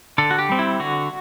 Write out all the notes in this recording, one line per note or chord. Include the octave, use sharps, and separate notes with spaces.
D3 A4
F#4
G4
G3 C4
E4
D3 F#4